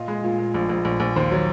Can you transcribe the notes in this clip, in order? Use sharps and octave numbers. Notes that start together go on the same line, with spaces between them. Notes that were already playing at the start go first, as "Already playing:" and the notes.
Already playing: A#2 F4 D#5
G#3
A#2
A#2
A#1
A#1
A#1
A#1
D#2 C5
F#3